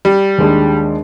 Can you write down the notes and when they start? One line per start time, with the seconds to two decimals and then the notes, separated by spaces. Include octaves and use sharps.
0.05 G3
0.38 D#2 G#3 D4